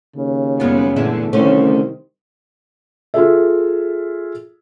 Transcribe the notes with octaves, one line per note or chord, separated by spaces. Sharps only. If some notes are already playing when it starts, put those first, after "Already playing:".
D#2 C#3
F#2 G3 G#3 B3 F4
E2 A#2 D3 G#3 A3 E5
C2 D3 D#3 A3 C#4 C5
F4 G#4 A4 E5